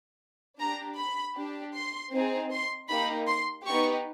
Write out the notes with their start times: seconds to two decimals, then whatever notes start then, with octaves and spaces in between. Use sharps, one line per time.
0.60 D4 G4 A#5
0.98 B5
1.36 D4 G4
1.75 C6
2.12 C4 D#4 G#4
2.51 C6
2.89 A#3 D#4 G4 B5
3.28 C6
3.66 B3 D#4 G4 C#6